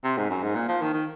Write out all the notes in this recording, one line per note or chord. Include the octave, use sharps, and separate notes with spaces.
C3
G#2
F#2
G#2
A#2
F3
D#3
D#3